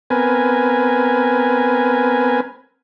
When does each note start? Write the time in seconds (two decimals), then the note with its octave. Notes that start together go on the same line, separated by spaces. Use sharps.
0.10 B3 C4 A#4 B4 G#5